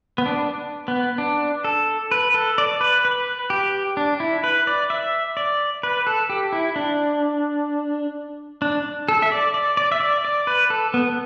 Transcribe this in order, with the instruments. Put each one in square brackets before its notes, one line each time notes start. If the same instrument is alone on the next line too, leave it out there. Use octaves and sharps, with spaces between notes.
[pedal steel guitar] B3
D4
B3
D4
A4
B4
A4
D5
B4
B4
G4
D4
E4
B4
D5
E5
D5
B4
A4
G4
E4
D4
D4
A4
E5
D5
D5
D5
E5
D5
D5
B4
A4
B3